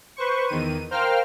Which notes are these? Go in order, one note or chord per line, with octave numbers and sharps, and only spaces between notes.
B4 C5 C#6
E2 D#3 D#7
A#4 C5 F5 G5 F6